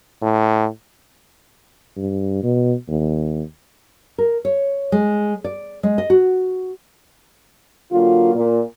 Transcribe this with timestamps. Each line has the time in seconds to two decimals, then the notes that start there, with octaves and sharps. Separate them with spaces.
0.22 A2
1.97 G2
2.43 B2
2.89 D#2
4.18 A#4
4.45 C#5
4.92 G#3
5.44 D5
5.83 G#3
5.98 D#5
6.10 F#4
7.91 D3 F#3 A#3 F4
8.35 A#2